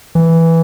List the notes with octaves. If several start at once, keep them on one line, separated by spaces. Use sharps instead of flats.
E3